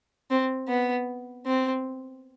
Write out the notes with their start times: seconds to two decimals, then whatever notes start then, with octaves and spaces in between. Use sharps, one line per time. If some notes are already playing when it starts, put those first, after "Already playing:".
0.30 C4
0.68 B3
1.46 C4